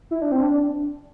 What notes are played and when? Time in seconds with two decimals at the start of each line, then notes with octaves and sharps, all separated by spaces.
0.11 E4
0.22 D4
0.32 C4
0.41 D4